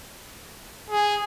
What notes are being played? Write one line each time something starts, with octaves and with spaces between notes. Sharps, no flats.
G#4